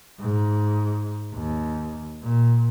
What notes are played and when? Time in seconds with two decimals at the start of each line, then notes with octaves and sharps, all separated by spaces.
0.20 G#2
1.34 D#2
2.22 A#2